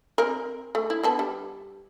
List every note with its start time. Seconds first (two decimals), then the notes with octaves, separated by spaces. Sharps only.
0.18 C4 A#4
0.75 A3
0.90 E4
1.03 D3 B3 A5
1.19 G3